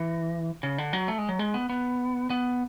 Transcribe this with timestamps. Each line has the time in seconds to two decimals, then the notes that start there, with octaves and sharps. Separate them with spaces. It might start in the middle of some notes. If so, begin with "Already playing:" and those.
Already playing: E3
0.63 C#3
0.78 D3
0.93 F#3
1.08 A3
1.18 G#3
1.29 F#3
1.39 G#3
1.54 B3
1.69 B3
2.30 B3